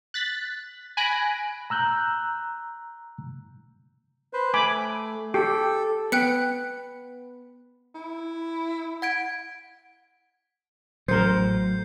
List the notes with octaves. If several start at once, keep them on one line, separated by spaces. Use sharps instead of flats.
F#6 A6 B6
G#5 B5 F#6 A#6 D7
A#5 E6 F#6 G6
B4 C5
A3 G#5 B5 D6
G4 A4
B3 G5 F#6 C#7
E4
F#5 G#6 D7
A1 F#3 A3 A#4 C5 G6 C7 C#7